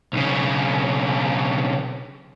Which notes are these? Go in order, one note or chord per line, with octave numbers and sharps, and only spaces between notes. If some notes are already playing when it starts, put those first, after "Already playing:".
B1 C#3